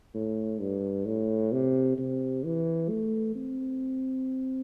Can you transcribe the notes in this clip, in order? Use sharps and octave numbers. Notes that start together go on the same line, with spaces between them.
A2
G2
A2
C3
C3
E3
A3
C4